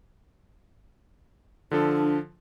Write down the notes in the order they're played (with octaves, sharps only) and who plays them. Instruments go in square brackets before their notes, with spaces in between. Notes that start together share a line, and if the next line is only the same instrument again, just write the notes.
[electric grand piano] D3 F3 A4 [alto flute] D4